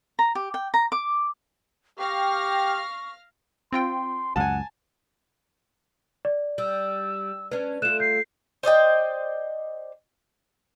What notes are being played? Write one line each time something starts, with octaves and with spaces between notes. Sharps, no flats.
A#5
G4
G5
A#5
D6
G4 F5 G5 C#6 F6 A#6
C4 F4 G5 C6
C#2 F#2 F#5 G#5 A5
D5
G3 E6
C#4 D4 B4
A3 F4 F#6 E7
G6 C7
C5 D5 D#5 G5